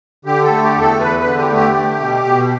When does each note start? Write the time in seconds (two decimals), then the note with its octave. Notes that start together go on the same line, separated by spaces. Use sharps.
0.25 D3 G4
0.43 A4
0.50 A3
0.63 G4
0.76 E2
0.81 A4
0.99 E2 B4
1.19 B4
1.24 D3
1.37 G4
1.50 A3
1.56 G4
1.74 A3
1.99 B2
2.24 B2